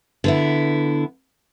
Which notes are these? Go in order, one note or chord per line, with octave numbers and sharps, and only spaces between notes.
D3 B3 E4